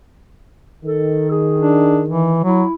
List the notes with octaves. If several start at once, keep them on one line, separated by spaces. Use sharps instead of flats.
D#3 A4
G#4
D4
E3
F#3 E4